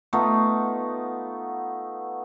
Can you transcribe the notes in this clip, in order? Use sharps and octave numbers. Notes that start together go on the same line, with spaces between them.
A3 B3 D#4 F4